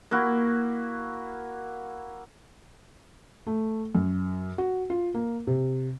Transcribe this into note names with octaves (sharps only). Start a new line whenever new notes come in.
A#3 E4 F#4
A3
F#2
F#4
F4
A#3
C3